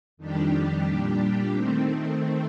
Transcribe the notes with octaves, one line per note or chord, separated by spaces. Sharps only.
F2 D#3 G3 D4 G4
A#2 G3 D4 G4
D#3 A3 C4